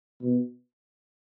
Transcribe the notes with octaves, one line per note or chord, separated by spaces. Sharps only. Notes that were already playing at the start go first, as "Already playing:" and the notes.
B2